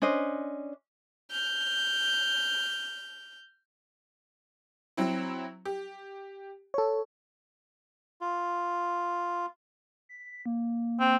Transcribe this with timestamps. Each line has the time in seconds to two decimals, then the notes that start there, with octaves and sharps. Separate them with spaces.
0.02 C#4 D4 C5 D#5
1.31 F6 G6
4.97 F#3 C4 E4
5.65 G4
6.74 A4 C#5
8.21 F4
10.09 B6
10.46 A#3
11.00 C4